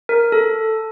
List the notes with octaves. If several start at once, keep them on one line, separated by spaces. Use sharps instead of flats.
A#4
A4